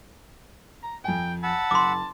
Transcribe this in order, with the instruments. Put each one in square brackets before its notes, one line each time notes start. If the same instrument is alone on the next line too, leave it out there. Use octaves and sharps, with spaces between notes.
[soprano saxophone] A#5
[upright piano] F2 G#5 [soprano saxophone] G5
[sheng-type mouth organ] F#5 B5 E6 [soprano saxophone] A5
[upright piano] F#1 [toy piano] C6 D6